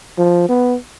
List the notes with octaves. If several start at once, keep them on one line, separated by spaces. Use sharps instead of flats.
F3
B3